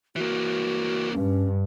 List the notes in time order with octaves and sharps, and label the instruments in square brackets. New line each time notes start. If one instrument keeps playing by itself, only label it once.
[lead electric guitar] E3 A#3 [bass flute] F#4
[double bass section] G2 [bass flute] C#4